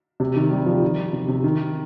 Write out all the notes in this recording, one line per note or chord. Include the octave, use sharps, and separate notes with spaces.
C3
D#3
G3
F3
D#3
C3
C3
D#3